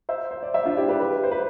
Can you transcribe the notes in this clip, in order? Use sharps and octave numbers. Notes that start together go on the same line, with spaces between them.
C5 E5
C5
D5
C5 E5
D4 F4
E4 G4
G4 B4
G4 B4
C5
B4